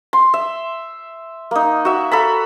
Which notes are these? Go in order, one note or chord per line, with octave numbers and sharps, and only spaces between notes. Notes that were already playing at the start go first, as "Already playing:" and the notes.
C6
E5
A#3 D#4
F#4 E5
A4 A#5 B5